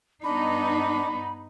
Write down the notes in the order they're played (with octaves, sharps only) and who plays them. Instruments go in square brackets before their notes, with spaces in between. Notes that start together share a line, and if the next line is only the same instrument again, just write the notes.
[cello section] G2 B3 D#4 [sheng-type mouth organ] D4 [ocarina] B5